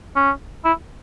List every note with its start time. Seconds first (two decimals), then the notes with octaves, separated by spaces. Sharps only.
0.16 C#4
0.65 E4